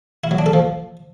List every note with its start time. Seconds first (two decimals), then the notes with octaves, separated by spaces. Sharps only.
0.24 E4
0.31 F#3
0.39 D4
0.46 A4
0.53 F3